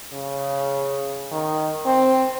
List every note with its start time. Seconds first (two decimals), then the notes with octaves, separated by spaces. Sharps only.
0.13 C#3
1.32 D#3
1.86 C4